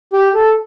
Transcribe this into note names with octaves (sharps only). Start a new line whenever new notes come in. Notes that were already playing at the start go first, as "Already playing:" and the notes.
G4
A4